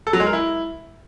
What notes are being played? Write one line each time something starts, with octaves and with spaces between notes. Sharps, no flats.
A4
F#3
G#3
A#4
E4